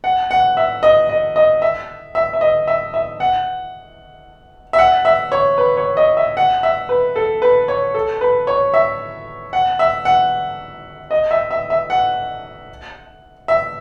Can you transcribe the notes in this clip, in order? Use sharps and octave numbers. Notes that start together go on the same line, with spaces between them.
F#5
F#5
E5
D#5
D#5
D#5
E5
E5
E5
D#5
E5
E5
F#5
E5
F#5
E5
C#5
B4
C#5
D#5
E5
F#5
E5
B4
A4
B4
C#5
A4
B4
C#5
E5
F#5
E5
F#5
D#5
E5
E5
E5
F#5
E5